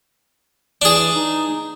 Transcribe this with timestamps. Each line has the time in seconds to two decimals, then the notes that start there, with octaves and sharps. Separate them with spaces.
0.82 E3 D4 G#4
1.13 D#4